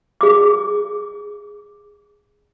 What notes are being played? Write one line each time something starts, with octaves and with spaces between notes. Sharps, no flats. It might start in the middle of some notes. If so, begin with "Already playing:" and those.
G#4 D6